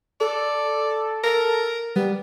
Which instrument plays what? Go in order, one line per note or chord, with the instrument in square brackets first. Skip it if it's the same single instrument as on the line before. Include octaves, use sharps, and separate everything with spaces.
[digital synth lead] A4 [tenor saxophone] D5
[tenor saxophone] A#4
[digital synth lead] G3 [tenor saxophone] B3